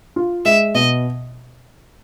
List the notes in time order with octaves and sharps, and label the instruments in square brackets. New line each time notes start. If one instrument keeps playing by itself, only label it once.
[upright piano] F4
[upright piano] G#3 [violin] E5
[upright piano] B2 [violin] D#5